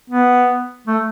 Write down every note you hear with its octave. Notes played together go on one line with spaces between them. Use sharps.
B3
A3